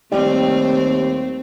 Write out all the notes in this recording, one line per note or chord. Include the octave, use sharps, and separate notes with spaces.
D#2 G3 A3 C4